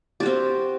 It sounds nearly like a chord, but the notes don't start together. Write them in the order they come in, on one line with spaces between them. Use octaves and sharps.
G4 F#4 C4